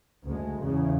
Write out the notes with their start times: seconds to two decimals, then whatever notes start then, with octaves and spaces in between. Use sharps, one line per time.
0.25 D2 G#3
0.61 E2 C#3